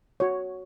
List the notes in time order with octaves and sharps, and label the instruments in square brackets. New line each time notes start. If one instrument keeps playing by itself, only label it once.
[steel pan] F#4 C#5